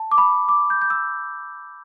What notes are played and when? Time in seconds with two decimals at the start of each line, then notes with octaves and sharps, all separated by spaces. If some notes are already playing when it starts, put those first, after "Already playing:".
Already playing: A5
0.12 D6
0.18 B5
0.49 D6
0.70 G6
0.82 G6
0.90 E6